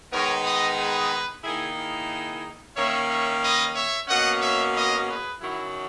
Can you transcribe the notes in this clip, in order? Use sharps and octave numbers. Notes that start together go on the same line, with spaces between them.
D#3 G#3 B3 D#4 A#4 C#5
B4 D#5
G#4 B4
D#3 A#3 D#4 E4 G#4
E4 G#4
D#3 A#3 C#4 C#5 E5
C#5 E5
B4 D#5
C#5 E5
B2 A#3 C#4 D#5 F#5
C#5 E5
B4 D#5
G#4 B4
F#2 D#3 F#3 E4